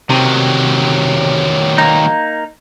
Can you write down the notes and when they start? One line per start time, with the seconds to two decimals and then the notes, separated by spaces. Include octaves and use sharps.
0.10 C3 D#3 F#3
1.78 A#3 D#4